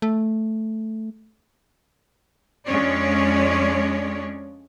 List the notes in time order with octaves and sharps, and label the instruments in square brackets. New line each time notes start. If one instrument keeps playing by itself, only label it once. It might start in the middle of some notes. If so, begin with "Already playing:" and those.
[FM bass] A3
[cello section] F2 G#3 C#4 D4 C#5 D5